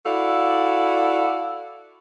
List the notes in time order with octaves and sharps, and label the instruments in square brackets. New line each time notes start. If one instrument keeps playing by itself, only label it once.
[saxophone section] E4 F#4 A4 D5 F5